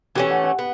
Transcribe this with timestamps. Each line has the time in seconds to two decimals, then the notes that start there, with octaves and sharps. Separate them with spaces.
0.15 E3 A3 C#4 G4
0.31 F#5
0.44 F#5
0.59 B3